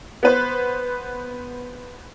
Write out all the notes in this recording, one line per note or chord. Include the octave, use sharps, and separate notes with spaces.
B3 B4 C5